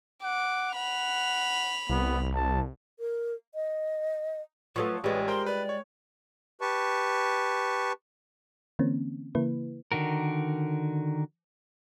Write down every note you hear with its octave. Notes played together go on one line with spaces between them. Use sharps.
F#5 D6
F#5 B5 F7
C2 B3
A5
A#4
D#5
F3 F#3 A3 B4 C#6
A1 G3 G#3 B4 C#5
A#4 C5 G5 C6
B4 D5
C#5
G4 B4 A5 C#6
D3 E3 A#3 C4 C#4
C#3 E3 A#3 E4 B4
D3 D#3 F#4 A#4